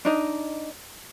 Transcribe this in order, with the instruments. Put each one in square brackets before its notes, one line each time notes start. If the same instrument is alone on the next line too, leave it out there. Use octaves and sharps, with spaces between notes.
[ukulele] D4 D#4 D#5